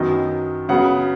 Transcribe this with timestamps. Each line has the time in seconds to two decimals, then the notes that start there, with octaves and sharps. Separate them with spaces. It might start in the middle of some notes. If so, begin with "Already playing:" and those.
Already playing: F#2 D#3 F#3 B3 D#5
0.69 C#3 F#3 B3 F#5